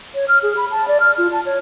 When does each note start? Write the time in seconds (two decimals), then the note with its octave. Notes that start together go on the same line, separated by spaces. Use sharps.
0.15 C#5
0.28 F6
0.43 G#4
0.57 B5
0.71 A5
0.88 D5
1.00 F6
1.18 F4
1.32 A5
1.46 C#5